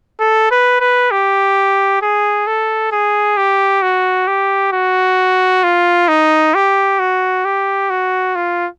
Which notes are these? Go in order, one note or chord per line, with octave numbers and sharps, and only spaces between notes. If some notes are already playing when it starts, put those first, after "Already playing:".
A4
B4
B4
G4
G#4
A4
G#4
G4
F#4
G4
F#4
F4
D#4
G4
F#4
G4
F#4
F4